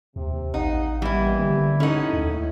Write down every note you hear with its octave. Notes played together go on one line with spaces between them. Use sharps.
D#2 C3
A1 D#4 F5 F#5
E3 G3 A#3 B3 E4 G4
D3
C#4 D#4 E4 A4 F#5
D#2 A2